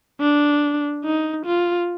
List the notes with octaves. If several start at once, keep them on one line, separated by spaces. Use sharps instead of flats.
D4
D#4
F4